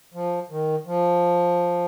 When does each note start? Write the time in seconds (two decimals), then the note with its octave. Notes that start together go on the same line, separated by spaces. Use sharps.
0.14 F3
0.50 D#3
0.86 F3